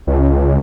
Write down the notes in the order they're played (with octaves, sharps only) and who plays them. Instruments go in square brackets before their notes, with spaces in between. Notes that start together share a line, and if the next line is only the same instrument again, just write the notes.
[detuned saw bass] C#2